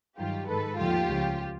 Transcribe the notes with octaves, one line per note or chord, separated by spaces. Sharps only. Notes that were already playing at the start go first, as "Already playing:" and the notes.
G2 D#3 F#3 F4 G4
G#2 D#3 G#3 A4 B4
D#2 D3 F3 A3 F4 G4
C#2 C#3 F3